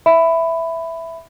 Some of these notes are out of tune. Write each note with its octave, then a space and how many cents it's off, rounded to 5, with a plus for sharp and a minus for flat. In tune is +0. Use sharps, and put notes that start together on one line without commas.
E5 +0 B5 +15